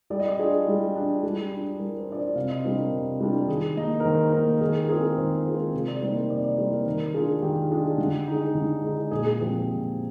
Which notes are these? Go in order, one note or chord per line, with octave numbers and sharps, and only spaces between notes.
G3 D5
D#5
D5
D4 F4 G#4
G3
D4 F4
G3
D4 F4
G3 A#4
C5
D4 F4 D5
C5
C3 F5
D#5
G3 D4 F4 C5
A#4
C3
G3 D4 F4
D#3 G#4
A#3 D#4 D#5
A#4
D#3 C5
A#3 D#4 A#4
D#3 G#4
A#4
G#3 C4 F4 G#4
D#3 C5
A#4
G#3 C4 F4
C5
C3 C5
D5
G3 A#3 D#4 C5
A#4
C3 D5
D5
G3 A#3 D#4 C5
A#4
D#3 A#4
G#3 D4 F4 G#4
D#3 G4
G#3 D4 F4
D3
G#3 D#4
D3
G#3 D#4
A#2 G#4
G#4
F3 G#3 C4 G4
A#2